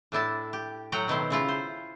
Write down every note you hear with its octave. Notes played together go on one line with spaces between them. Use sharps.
A2 D4 E4 A5
G4
A2 F#3 F#5 G5 A#5
B2 D#3 E4 C5
C#3 E4 F4
C5